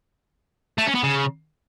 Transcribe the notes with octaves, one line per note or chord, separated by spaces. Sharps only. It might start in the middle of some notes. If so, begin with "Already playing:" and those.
A3
C#4
B3
C#3